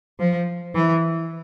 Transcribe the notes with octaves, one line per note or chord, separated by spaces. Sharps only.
F3
E3